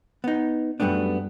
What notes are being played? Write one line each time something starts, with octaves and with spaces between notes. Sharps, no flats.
B3 D#4
F#2 G3 A3 B3 D4